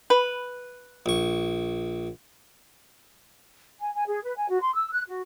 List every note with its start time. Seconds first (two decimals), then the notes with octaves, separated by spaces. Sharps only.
0.10 B4
1.06 A#1 C#6
3.80 G#5
3.94 G#5
4.06 G#4
4.23 B4
4.36 G#5
4.49 F#4
4.61 C6
4.74 E6
4.92 F#6
5.07 F#4